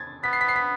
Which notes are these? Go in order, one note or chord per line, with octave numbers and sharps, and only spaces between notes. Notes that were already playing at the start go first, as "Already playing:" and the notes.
Already playing: G#6 A6
B3 B6
C7
B6
C7
B6